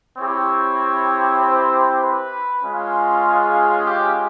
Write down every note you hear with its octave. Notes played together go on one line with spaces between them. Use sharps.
C4 E4 G4 C#5
C5
B4
G#3 C#4 F4
G#4
G4